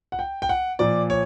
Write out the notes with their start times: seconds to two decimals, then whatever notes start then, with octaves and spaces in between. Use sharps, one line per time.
0.12 F#5
0.19 G5
0.42 G5
0.49 F#5
0.79 A#2 F3 D5
1.10 C#5